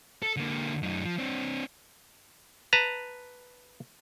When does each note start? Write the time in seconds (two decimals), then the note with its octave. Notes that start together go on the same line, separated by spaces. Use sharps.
0.22 A4
0.37 D3 A#3
0.83 F#2 D#4
1.05 F3
1.18 C4 D4
2.73 B4 A5 A#5